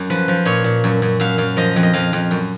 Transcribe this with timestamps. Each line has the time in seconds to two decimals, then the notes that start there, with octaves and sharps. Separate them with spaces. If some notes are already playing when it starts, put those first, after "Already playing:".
Already playing: F#2
0.10 F3 B4
0.28 F3
0.45 A#2 C#5
0.64 A#2
0.84 F#2
1.02 F#2
1.20 F#2 F5
1.38 F#2 F5
1.57 F3 D#5
1.76 F2
1.83 D#5
1.93 F2 F5
2.13 F2
2.31 F#2